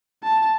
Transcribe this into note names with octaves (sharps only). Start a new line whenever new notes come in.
A5